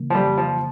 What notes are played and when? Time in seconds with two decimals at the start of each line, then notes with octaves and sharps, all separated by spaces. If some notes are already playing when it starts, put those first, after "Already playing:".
Already playing: C#3 E3 A#3
0.10 F3
0.15 G3
0.26 F2
0.37 F3